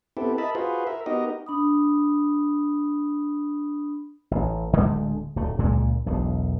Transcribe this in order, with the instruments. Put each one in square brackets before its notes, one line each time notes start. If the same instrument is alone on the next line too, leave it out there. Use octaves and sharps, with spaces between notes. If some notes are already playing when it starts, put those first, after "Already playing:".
[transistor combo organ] B3 C4 E4 G4 A4
A#4 D#5 E5 A5 B5
F4 F#4 G#4 B4 C5
A#4 E5
B3 D#4 F#4 G4 A#4 D#5
[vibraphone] D4 B5 D#6
[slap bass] A1
D1 D3 G#3 A3
D1 A3
C#2 A#2 G#3
E1 B1